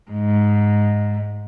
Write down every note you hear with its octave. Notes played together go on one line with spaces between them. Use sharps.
G#2